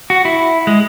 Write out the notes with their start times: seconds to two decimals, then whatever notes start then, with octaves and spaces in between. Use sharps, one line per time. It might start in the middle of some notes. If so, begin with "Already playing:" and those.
0.10 F#4
0.25 E4
0.67 G#3